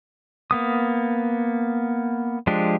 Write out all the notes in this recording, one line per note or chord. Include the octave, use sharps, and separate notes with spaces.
A#3 B3 D#6
F3 G#3 D4 G4